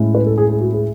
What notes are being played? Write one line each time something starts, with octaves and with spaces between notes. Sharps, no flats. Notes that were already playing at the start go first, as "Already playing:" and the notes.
Already playing: A2 G#3 C#4 E4
B4
A4
G#4
G#4
F#4
G#4